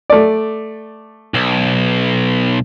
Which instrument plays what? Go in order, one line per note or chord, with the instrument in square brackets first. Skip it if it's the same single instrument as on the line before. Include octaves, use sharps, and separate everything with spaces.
[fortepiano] A3 D5
[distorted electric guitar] B1